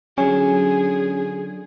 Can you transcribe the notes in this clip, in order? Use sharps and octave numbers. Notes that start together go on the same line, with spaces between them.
D3 F#3 C#4 F4 G#4 G#5